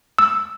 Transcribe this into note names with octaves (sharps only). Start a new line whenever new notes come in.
E6